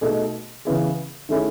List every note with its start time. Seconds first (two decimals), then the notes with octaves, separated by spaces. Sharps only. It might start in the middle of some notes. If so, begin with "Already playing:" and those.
0.01 B2 A3 D#4 G#4
0.65 C#3 E3 B3 E4 G#4
1.29 D#3 A3 C#4 E4 G#4